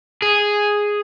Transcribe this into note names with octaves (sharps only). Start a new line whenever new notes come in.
G#4